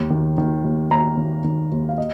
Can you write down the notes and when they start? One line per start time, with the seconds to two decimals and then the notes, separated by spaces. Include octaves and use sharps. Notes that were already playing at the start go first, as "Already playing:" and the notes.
Already playing: D#2
0.10 D#3
0.38 D#3
0.64 D#2
0.91 D#2 A#5
1.17 D#3
1.44 D#3
1.72 D#2
1.89 F5
1.98 D#5